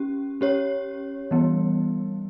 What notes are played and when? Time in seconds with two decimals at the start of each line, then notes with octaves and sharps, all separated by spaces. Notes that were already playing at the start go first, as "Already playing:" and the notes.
Already playing: C#4 G4
0.41 C#4 G4 C#5
1.31 E3 G3 B3